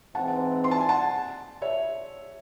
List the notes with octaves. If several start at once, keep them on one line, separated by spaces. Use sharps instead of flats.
G#2 E3 C4 E4 F#5 A5
C6
A5
G#5
F#5 A5
C#5 E5